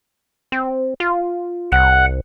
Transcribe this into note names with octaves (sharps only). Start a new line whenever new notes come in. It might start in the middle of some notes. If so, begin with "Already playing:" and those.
C4
F4
C2 F#5